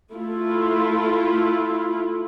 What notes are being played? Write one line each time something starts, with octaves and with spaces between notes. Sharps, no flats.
A3 E4 F4